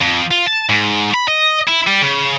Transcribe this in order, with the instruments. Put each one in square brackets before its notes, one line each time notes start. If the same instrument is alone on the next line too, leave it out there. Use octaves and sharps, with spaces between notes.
[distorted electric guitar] F2
F4
A5
G#2
B5
D#5
E4
G3
C#3